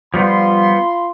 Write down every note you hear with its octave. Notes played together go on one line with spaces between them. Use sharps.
F3 G3 B3 F4 B5 C6